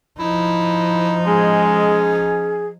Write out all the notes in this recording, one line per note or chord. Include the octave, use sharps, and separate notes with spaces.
F3 D#4 E4
G#3 C#4 G#4